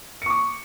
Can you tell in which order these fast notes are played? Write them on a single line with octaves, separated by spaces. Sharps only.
C#7 C#6 D6